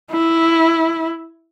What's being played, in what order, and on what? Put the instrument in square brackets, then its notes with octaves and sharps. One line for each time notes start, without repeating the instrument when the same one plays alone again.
[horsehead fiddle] E4